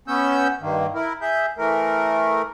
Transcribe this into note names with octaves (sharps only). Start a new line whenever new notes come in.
B3 C#4 E6 G6
G2 D#3 A#3
E4 A#4
G#4 E5 G6
E3 A3 A#4